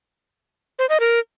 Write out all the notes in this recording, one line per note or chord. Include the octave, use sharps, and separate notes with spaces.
C5
D#5
A#4